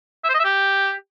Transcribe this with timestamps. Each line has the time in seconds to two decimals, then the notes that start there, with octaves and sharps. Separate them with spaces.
0.24 E5
0.29 C5
0.34 D#5
0.39 E5
0.44 G4